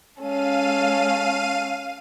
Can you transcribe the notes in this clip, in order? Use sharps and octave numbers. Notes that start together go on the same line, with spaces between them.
G#3 C#4 A4 F5 D#7